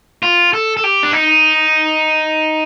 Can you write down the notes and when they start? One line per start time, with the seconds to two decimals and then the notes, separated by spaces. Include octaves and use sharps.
0.23 F4
0.53 A4
0.77 A4
0.84 G4
1.03 D4
1.13 D#4